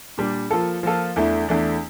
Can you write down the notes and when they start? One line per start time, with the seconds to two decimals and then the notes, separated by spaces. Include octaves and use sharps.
0.18 A#2 G3 D4
0.51 F3 A#3 F4 A4
0.83 F3 A#3 F4 A4
1.16 E2 E3 A3 D4
1.49 E2 E3 A3 D4